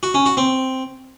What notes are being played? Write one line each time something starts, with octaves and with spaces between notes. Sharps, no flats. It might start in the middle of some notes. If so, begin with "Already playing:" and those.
F#4
C#4
F#4
C4